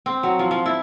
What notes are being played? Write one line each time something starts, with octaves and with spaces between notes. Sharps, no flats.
C4
F#3
F3
F3
E4